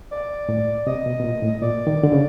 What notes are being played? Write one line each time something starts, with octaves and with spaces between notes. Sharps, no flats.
D5
A2
C3 D#5
B2
B2
A#2
A2
A#2 D5
D#3
D3
C#3